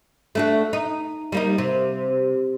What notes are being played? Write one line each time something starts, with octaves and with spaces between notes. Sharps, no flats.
A3 D4 F#4
D#4
G3 A#3 D#4
C3